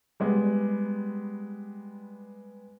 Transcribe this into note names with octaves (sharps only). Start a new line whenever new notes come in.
G3 G#3 B3